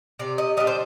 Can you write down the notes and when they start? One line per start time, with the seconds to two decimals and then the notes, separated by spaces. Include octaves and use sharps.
0.19 C3 D5
0.38 D#5
0.57 G3 D4 D#5
0.67 C5